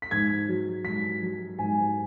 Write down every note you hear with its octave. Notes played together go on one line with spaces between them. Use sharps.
B6
G#2 G#6
F#3
G#2 B6
F#3
G#2 G#5